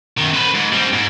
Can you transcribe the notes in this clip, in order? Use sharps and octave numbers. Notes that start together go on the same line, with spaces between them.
F#2 D#3
B4 C5
G#2
G3 C4
G#2